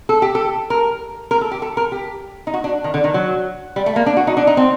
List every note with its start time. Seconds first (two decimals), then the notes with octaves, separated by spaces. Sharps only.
0.09 A4
0.22 G4
0.35 A4
0.70 A#4
1.31 A#4
1.41 A4
1.52 G4
1.62 A4
1.77 A#4
1.92 G4
2.47 D#4
2.54 F#4
2.64 D4
2.84 D#3
2.94 D3
3.04 D#3
3.14 F#3
3.76 G3
3.86 A3
3.96 A#3
4.06 D4
4.17 F#4
4.27 D#4
4.37 D4
4.47 D#4
4.57 C4